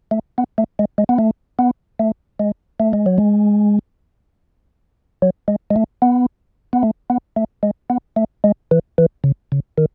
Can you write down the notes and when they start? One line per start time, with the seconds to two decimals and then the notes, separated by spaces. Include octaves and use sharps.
0.11 A3
0.38 B3
0.58 A3
0.79 G#3
0.98 G#3
1.09 B3
1.19 A3
1.59 B3
1.99 A3
2.40 G#3
2.80 A3
2.93 G#3
3.06 F#3
3.18 G#3
5.22 F#3
5.48 G#3
5.70 G#3
5.76 A3
6.02 B3
6.73 B3
6.83 A3
7.10 B3
7.36 A3
7.63 G#3
7.90 B3
8.16 A3
8.44 G#3
8.71 E3
8.98 E3
9.24 C#3
9.52 C#3
9.78 D#3